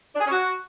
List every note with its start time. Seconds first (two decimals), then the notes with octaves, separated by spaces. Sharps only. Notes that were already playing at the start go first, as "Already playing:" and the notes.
0.14 D4
0.19 G#4
0.25 C#4
0.31 F#4